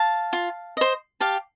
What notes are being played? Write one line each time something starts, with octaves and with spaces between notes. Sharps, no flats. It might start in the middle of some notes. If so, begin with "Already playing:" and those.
Already playing: F5 A5
F4
C5 D#5
G4 F5 A5